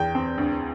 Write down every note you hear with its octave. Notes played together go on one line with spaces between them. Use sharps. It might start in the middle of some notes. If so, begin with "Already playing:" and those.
Already playing: E2 G5
C4
D2